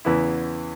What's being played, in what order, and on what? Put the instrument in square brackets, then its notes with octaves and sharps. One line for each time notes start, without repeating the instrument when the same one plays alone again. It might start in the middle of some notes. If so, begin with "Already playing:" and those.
[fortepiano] E2 C#3 E3 B3 E4